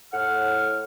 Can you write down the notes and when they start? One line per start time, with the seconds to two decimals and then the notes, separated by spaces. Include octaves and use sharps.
0.13 A2 F#5 F6